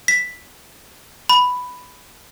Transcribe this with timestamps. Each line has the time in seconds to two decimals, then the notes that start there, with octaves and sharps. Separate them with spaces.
0.08 B6
1.29 B5